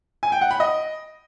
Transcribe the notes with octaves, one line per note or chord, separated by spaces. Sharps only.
G#5
G5
F#5
B5
D#5